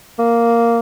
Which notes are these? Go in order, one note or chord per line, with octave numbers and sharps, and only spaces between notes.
A#3